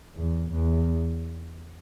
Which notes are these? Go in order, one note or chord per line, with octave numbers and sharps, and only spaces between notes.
E2
E2